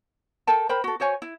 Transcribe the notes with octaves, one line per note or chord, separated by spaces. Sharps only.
A4 A#4 G5 A5
A#4 C5 G5 B5
F#4 A4
F#4 C5 C#5 G#5
E4